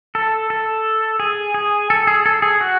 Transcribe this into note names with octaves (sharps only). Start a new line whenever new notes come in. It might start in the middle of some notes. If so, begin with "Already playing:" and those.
A4
A4
G#4
G#4
A4
G#4
A4
G#4
F#4